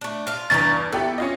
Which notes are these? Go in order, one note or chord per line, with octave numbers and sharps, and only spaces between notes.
A3 D4
F4 F5
E2 G2 C#4 D5 A#5 A6
B3 E4 G4 A4
C#4 F4 D#5